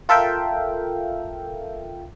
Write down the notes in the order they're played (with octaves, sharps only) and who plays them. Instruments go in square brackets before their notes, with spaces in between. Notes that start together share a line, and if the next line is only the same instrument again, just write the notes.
[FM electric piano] F4 A4 A#4 E5 F5 G5